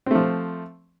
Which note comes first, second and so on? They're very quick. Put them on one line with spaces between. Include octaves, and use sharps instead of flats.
C4 A3 F3